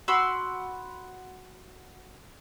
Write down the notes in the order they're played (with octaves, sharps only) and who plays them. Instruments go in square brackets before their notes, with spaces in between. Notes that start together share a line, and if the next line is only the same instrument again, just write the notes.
[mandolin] F#4 B5 C6 E6